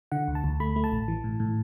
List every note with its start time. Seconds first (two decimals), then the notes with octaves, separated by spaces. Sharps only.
0.12 D3 F#5
0.28 D2
0.35 A5
0.44 D2
0.60 A3 B5
0.76 A3
0.84 A5
0.92 A1
1.08 E3
1.24 A2
1.40 A2